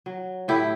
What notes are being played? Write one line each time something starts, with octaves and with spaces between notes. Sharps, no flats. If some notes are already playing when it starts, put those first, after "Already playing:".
F#3
A2 E4 G4